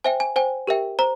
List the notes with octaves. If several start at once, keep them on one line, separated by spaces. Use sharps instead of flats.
C5 E5 G5 G#5
G#5
C5 G5 G#5
G4 A#4 E5 G5
C5 A#5